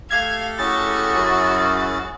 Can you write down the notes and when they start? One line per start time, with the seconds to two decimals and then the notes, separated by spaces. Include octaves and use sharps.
0.11 A3 G4 A4 F5 G#6
0.59 C#4 E4 F#4 G#4 A6
1.13 F#2